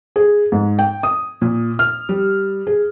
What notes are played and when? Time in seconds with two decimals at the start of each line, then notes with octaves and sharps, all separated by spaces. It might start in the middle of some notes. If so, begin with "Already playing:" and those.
0.16 G#4
0.52 G#2
0.79 G5
1.03 D#6
1.42 A#2
1.79 F6
2.09 G3
2.67 G#4